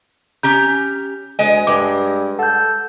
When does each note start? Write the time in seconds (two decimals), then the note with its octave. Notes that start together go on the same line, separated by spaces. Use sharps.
0.43 C#4 G4 A#5 G6
1.39 D2 G#3 D#5 G#5
1.67 G2 G#3 D6
2.39 A4 F#5 G6